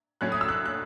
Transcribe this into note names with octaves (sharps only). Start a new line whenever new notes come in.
A2 F#3 C#4 F#6
D#6
E6
F#6
F#6